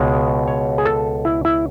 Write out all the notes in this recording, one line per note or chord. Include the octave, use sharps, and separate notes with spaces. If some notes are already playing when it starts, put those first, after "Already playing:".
Already playing: C#2 B2 G#3
C#5
G#4
A4
E4
E4